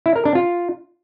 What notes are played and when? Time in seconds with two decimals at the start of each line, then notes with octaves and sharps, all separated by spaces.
0.06 E4
0.16 A#4
0.25 D4
0.35 F4